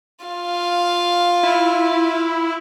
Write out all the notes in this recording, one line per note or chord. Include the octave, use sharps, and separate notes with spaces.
F4 F5
E4